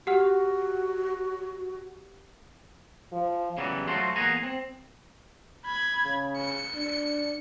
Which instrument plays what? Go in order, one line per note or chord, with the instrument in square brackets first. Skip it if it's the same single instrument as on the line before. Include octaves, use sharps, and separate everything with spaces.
[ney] F#4 [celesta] G4 F#5 F6
[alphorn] F3
[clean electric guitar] C#3 E3 F#3 G3 B3
F#3 A3 F4 F#4 C5
E2 A#3 G#4 F#5 G#5 A#5
C4
[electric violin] B5 G#6
[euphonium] C#3
[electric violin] C#7
[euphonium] D4